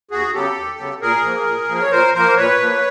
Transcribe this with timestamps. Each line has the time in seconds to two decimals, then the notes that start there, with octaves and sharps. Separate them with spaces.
0.11 D#2 F#4 G#4
0.33 C#3 F#3 B3 G4 A4
0.56 D#2
0.79 C#3 F#3 B3
1.01 A#2 G#4 A#4
1.24 F3 A#3
1.46 A#2
1.69 F3 A#3
1.81 C#5
1.91 A#2 A#4 C5
2.14 F3 A#3 A#4 C5
2.37 A#2 B4 C#5
2.60 F3 A#3